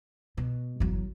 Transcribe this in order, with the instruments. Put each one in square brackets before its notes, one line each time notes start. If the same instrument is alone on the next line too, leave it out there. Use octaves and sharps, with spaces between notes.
[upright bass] B2
[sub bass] G1 [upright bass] E2 F#3